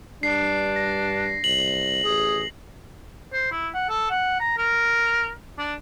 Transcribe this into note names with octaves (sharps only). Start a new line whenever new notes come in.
G2 D4 C7
A#6
C2 F#7
A1 G#4
C5
E4
F#5
A4
F#5
A#5
A#4
D4